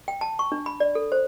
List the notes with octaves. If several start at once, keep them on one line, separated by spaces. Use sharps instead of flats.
G5
A5
C#6
D4
B5
D5
A4
C5